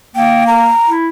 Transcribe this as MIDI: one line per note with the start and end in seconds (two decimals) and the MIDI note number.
0.15 0.70 58
0.15 0.47 79
0.47 0.90 82
0.88 1.09 64